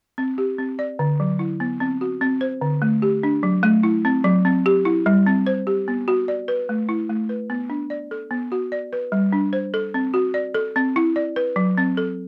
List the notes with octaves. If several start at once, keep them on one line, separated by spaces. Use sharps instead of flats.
C4
G4
C4
D5
D3
F#3
E4
B3
C4
F#4
C4
C5
D3
A3
G4
D4
F#3
A3
E4
C4
F#3
C4
G4
E4
G3
C4
C5
G4
B3
F#4
D5
B4
A3
E4
A3
B4
B3
D4
D5
A4
B3
F#4
D5
B4
G3
D4
C5
A4
C4
F#4
D5
A4
C4
E4
D5
B4
F#3
C4
A4